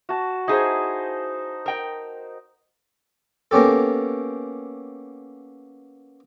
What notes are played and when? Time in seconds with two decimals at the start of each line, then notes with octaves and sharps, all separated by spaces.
0.09 F#4 A5
0.48 D#4 E4 G#4 C5
1.66 A#4 G5
3.51 A#3 B3 C#4 G4 A4